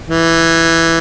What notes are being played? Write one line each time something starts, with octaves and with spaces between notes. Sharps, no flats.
E3